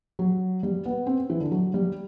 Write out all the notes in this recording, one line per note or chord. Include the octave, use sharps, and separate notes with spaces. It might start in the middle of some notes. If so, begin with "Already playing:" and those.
F#3
G3
B3
C4
E3
D3
F#3
G3